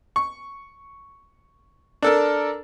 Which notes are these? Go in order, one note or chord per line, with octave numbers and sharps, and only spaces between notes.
C#6
D4 A4 A#4